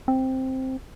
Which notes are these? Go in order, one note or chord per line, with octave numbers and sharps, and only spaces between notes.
C4